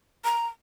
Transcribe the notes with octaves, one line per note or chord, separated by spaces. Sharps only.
A#5